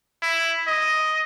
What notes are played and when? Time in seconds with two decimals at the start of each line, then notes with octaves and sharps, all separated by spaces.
0.23 E4
0.68 D#5